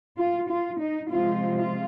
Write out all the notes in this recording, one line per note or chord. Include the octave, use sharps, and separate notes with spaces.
F4
F4
D#4
C3 F3 G#3 C4 F4
F4